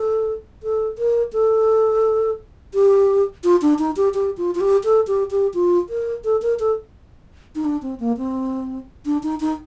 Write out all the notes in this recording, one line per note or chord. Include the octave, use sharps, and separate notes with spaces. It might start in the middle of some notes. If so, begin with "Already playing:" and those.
Already playing: A4
A4
A#4
A4
G4
F4
D4
D#4
G4
G4
F4
F4
G4
A4
G4
G4
F4
A#4
A4
A#4
A4
D#4
D4
C4
A#3
C4
D4
D#4
D#4